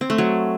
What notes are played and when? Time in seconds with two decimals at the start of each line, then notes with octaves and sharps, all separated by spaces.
0.01 C4
0.10 A3
0.18 F#3